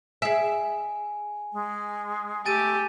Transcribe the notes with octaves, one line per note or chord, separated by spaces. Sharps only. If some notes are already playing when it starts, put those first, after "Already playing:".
G#4 E5 G#5
G#3
A3 G4 G#5 A6 D#7